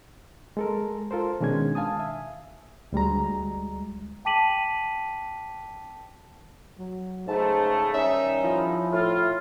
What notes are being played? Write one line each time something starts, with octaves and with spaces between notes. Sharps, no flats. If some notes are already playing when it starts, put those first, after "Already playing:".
G#3 A4 A#4
F4 A4 A#4 C5
B2 D#3 G#3 C#4 D4 G#6
F5 G#5 A5 D#6
E5
D2 G3 G#3 A#5
G5 A5 D6 B6 D#7 F#7
F#3
G#2 C#3 A3 A5
D#3 G3 C#4 D#4 E5
F3 E4
A2 F4